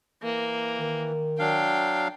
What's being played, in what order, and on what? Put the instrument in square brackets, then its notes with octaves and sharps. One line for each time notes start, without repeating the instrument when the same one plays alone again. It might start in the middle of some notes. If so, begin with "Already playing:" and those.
[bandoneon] E3 [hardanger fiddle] A#3
[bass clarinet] D#3
[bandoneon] F#3 D4 F5 [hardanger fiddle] G5